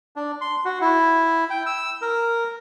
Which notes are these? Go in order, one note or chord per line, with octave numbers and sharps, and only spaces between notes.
D4
C6
F#4
E4
G5
E6
A#4